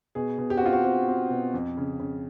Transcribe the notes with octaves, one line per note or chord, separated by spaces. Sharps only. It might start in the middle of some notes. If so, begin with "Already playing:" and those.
B2 G#4
B2
G4
F#4
C4 F4
F#4
C4 G4
C4
B2
F2
C#3
C#3